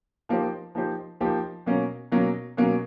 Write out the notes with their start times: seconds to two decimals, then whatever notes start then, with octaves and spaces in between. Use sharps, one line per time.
0.29 F3 A#3 D#4 G4 C5
0.75 F3 A#3 D#4 G4 C5
1.20 F3 A#3 D#4 G4 C5
1.66 B2 F#3 A#3 C#4
2.12 B2 F#3 A#3 C#4
2.57 B2 F#3 A#3 C#4